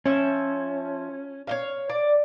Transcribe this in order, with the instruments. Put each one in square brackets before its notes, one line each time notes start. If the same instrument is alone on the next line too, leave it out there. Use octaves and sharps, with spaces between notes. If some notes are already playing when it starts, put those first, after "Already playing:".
[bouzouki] F3 E5 [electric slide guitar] C#4
[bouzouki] C#5 D#5 F5
D5